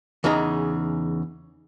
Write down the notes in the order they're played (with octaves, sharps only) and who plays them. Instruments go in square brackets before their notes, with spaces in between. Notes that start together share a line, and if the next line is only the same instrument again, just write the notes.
[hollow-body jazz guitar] E2 C#3 D#4 G#4 A#5